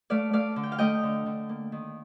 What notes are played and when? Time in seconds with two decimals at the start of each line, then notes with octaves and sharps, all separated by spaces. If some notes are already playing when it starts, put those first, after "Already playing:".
0.10 A3 D5 F5
0.33 A3 D5 F5
0.56 D3
0.63 G5
0.72 F5
0.78 A3 D#5 G5
1.03 D3
1.26 D3
1.49 A#3
1.72 D#3